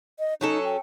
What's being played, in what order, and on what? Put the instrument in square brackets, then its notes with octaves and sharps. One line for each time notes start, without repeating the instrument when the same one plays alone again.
[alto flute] D#5
[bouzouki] F#3 C#4 A4 [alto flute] D#4
[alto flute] G5